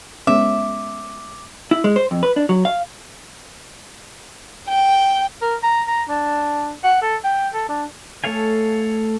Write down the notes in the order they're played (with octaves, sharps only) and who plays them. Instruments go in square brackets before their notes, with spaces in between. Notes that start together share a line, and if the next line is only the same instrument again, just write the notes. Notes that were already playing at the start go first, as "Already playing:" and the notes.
[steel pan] G#3 B3 C#4 [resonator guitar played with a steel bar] E5 [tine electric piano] D6
[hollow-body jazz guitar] E4
G#3
C5
F2
B4
D4
F#3
F5
[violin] G5
[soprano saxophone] A#4
A#5
A#5
D4
F#5
A4
G5
A4
D4
[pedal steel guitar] A3 A4 C#5 F5 G#5